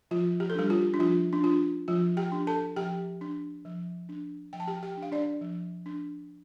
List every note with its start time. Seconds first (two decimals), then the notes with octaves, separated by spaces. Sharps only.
0.11 F3 F4
0.40 G4
0.50 A4
0.55 G3 D4 G4
0.70 F4
0.94 D4
0.99 F3 F4
1.33 D4
1.44 D4 F4
1.88 F3 F4
2.17 G4 G5
2.32 D4
2.47 A4 A5
2.76 F3 G4 G5
3.21 D4
3.65 F3
4.09 D4
4.53 F3 G5
4.60 A5
4.68 G4 G5
4.83 G4 G5
4.97 D4
5.02 F5
5.12 D4 D5
5.41 F3
5.86 D4